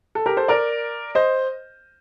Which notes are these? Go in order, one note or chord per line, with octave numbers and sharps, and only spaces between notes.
A4
G4 A#4
A4 C5
A#4 D5
C5 D#5